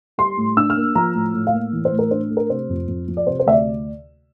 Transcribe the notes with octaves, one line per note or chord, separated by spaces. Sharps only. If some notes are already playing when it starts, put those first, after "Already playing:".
G3 C6
A2
D4 E6
F6
A#3
F3 A#5
A2
A2
F5
A#3
E3
C5
A2
A#4
D4 C5
A3
A#4
C3 C5
F2
F2
F3
D5
C3 C5
C5
D2 E5
D5